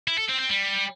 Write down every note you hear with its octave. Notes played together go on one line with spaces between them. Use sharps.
E4
A4
C4
C4
G3